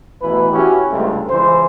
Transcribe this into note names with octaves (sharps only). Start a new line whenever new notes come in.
A1 B2 E3 B4
C#4 E4 F#4 G4
C#2 G2 C3 A3
C#2 E3 C5